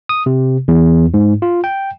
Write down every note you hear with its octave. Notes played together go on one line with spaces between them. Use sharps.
D#6
C3
E2
G#2
F4
G5